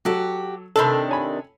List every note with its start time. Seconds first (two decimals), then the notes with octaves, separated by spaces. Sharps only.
0.05 F#3 F#4 G4 A4
0.76 C3 D#3 D4 A4 A5 B5
1.09 C#5 G#5 B5